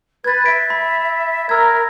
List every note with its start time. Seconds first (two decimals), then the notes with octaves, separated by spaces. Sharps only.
0.24 B4 G#6 A6
0.45 E5 B6 D7
0.70 B5
1.49 A#4 E6 G#6